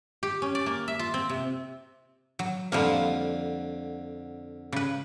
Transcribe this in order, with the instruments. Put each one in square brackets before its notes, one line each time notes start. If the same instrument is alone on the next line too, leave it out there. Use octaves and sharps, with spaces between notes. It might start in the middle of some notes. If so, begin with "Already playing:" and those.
[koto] G4
C#4
D5
A#3
E5
F4
C4
C3
F#3
[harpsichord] F2 D3 [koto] F3 G3 A#3
[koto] C#3 B4